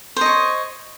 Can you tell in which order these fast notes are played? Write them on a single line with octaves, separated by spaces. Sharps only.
C5 D#5 C#5